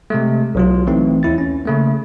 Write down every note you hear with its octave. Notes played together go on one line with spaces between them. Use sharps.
C3 G#3 A3
B1 F#3 F4
E3 A3 C4 D#4
D#2 E4 A6
C#4
C#3 A3 A#3